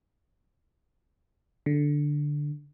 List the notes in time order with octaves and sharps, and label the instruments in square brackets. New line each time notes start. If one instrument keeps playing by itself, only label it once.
[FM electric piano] D3